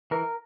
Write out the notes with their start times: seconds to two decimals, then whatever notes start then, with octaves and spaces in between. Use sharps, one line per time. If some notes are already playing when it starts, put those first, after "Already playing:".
0.11 E3 A#4